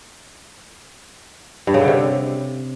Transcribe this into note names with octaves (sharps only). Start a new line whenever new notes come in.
G2
C#3
D3
C3